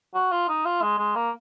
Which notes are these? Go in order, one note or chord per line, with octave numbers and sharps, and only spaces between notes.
F#4
F4
D#4
F4
G#3
G#3
A#3